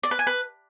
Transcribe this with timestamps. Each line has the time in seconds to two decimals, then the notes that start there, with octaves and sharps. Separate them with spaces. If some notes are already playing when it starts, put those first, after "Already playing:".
0.03 D5
0.11 B4
0.19 G#5
0.27 B4